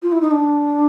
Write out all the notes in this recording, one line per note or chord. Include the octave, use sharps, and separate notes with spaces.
F4
E4
D#4
D4